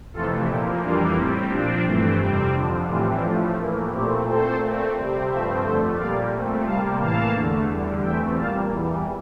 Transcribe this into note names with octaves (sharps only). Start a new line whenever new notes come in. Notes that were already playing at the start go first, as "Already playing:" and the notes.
F2 C3 E3 A3 F4 A4
A#2 F3 A#3 E4 G4
F2 E3 G3 A#3 D4 F4
A2 G3 C4 E4
A#2 F3 C4 D4
G2 E3 A3 C4
F2 C3 G3 C4
F2 D3 F3 D4
A2 E3 G3 C4 D4 F4
A2 F3 A3 D4 F4
A2 E3 A#3 E4
A#2 A3 C4 E4 G4
A#2 A3 C4 A4 C5
A#2 A3 C4
C3 G3 C4
G2 F3 A3 C4 C5 E5
F2 D3 A3 A4 C5
A#2 G3 A#3 D5 F5
A#2 A3 C4
C3 G3 A#3 F5 A5
A2 E3 A#3 F5 A5
E2 D3 A3
E2 D3 G3
E2 E3 A3 C4 E5 G5
A#2 G3 A#3 F5 A5
E2 E3 G3